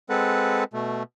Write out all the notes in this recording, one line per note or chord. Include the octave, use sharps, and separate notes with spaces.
G#3 C4 A4 B4 F#5
B2 A3